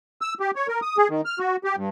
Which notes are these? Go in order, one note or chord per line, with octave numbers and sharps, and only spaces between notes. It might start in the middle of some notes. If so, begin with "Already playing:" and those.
E6
G4
C#5
A#4
D#6
G#4
D#3
F6
F#4
G4
G2